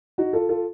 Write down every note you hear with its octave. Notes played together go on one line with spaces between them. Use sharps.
D#4 F#4
F4 A4
F4 A4